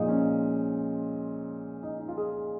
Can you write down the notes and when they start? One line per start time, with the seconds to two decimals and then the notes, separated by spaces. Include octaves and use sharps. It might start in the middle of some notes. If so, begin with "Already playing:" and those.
Already playing: A#2 F3 G#3 D#4
0.08 C#4
1.83 D#4
1.99 D#4
2.08 F4
2.17 D#4 G#4